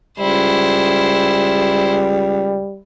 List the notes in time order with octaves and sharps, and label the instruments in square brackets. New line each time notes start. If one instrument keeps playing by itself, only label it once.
[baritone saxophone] C#2 [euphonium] G3 [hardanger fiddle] E4 C5